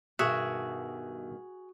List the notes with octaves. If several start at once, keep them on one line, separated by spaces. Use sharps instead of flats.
G2 B2 D#3 F#4 G#4 E5